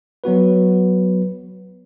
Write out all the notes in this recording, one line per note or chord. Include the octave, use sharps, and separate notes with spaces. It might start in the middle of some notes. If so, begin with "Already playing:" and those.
F#3 B3 F#4 B4